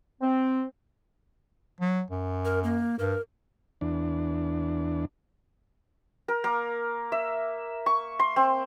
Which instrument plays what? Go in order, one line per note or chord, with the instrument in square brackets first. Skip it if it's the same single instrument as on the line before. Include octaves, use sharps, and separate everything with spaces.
[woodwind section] C4
[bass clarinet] F#3
F#2
[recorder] A#4
A#3
[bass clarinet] G2 [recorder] A#4
[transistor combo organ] E2 D4
[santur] A#4
A#3
E5
C#6
C6
C4